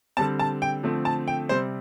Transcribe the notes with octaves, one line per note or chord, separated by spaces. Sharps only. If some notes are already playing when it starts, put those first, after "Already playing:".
D3 G3 C4 A5
A5
G5
D3 F3 A3 C4
A5
G5
C3 G3 C4 C5